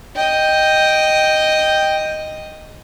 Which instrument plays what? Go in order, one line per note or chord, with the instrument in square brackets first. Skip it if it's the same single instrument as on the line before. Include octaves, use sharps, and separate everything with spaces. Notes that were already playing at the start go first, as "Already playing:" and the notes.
[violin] D#5 [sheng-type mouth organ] G5